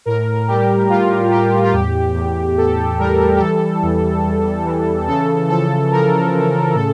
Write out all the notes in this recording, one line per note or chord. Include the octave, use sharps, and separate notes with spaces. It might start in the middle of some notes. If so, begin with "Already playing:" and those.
A2 A#4
G3 G4
G3 F4
A2 G4
F4
E2 G4
E2
E2 A4
G3 A#4
G4
E3 A4
E2
E2
E3
C#3 A4
F3 A4
F3 A#4
C#3
A2 A4